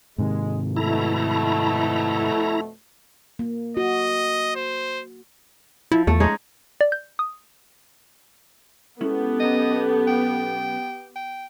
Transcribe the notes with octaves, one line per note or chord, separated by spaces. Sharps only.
G#2 C3 D#3 G#3
F2 B2 A3 E4 A#5
A#3
F#4 D#5
C5
F3 E4
E2 A3
G#3 C#4 D#4
D5
G6
D#6
G#3 B3 C#4 E4 G4 A4
B1 C#4 D#5 A#5
G5
G5